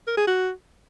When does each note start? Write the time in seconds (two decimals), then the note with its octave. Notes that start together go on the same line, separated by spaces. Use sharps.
0.07 A#4
0.17 G#4
0.27 F#4